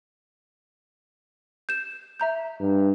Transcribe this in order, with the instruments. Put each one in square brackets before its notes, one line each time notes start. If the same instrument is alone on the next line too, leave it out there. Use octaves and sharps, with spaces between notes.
[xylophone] G6 E7
E5 A#5 G6
[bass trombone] G2